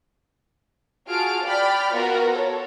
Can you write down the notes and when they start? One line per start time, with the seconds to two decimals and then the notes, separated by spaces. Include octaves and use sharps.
1.10 F4 F#4 G#4 A5 F6 D7
1.45 D5 G5 B5 F6
1.94 B3 F4 F#4 A#4 A#5
2.32 A4 C#5